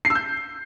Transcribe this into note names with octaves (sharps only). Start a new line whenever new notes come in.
C7
E6
G6